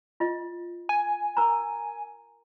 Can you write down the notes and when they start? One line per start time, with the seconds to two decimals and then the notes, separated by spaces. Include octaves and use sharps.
0.20 F4 D#5
0.89 G#5
1.37 A#4 A#5